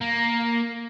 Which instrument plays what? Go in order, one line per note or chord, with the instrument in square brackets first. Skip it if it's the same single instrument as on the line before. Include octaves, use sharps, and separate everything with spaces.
[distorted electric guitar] A#3